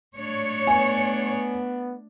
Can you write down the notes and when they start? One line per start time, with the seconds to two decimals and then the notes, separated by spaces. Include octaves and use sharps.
0.17 A3 D4 C#5
0.67 B3 G#5